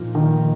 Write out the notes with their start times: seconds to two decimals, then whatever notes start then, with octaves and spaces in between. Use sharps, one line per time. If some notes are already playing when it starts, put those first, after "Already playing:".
Already playing: A#2 F3 A#3 D#4
0.15 D#3